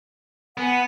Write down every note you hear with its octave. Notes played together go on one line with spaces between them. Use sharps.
B3 F#5 G#5